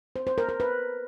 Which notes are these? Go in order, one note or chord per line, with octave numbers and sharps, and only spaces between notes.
C5
C5
A#4
A#4
B4